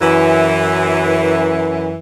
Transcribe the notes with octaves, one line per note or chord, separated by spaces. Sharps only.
F#2 E3